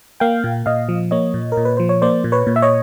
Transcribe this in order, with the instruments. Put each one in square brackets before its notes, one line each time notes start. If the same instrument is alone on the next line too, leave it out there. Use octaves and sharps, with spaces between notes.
[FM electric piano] A#3 F5 G5
A#2
A#2 D#5 F5
F3
A#3 C#5 D#5
A#2
A#4
A#2
B4
F3 C5
C#5
A#3 C5 D5
A#2
B4 C#5
A#2
E5
C#5 D#5